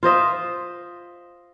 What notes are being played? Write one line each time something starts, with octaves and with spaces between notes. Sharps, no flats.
F4 C5 D#5 E5